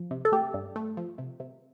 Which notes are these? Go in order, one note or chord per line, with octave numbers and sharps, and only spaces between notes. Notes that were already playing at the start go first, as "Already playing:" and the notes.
Already playing: F3
C3
A4
A3 G4
G2
A3
F3
C3
C3